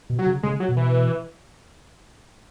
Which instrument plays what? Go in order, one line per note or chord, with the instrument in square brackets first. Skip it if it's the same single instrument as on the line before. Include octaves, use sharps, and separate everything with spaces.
[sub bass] B2
[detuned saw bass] F#3
[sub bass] C#3
[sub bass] C#3 [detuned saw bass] G#3
[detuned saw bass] F#3
[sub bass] B2
[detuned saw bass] E3